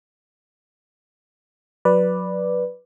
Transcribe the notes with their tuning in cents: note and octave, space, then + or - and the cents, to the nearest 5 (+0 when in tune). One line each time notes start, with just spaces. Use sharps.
F#3 -30 B4 -5 D5 +0